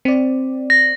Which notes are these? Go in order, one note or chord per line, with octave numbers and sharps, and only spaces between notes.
C4 D5
A#6